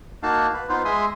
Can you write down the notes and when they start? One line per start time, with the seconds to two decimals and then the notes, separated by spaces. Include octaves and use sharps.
0.23 A#3 D#4 F#4 F5 A5
0.53 B4
0.69 B3 D#4 F4 B4 C5 F5
0.85 G#3 E5 G#5 C6 D#6